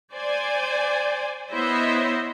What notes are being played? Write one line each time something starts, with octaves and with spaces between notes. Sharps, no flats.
C5 D5 G#5
B3 E4 C5 C#5 D#5 E5